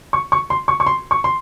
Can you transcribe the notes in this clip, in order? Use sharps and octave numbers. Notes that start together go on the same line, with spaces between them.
C#6
C#6
C6
C#6
C#6
C6
C#6
C6